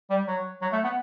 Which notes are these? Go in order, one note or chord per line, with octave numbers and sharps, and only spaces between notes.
G3
F#3
F#3
A3
B3